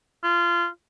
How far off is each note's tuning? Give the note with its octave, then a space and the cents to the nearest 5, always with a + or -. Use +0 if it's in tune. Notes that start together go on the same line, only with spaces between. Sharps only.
F4 -20